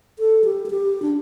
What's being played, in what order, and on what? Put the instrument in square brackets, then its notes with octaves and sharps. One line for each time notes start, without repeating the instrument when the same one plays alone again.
[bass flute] A4
G4
A4
G4
D4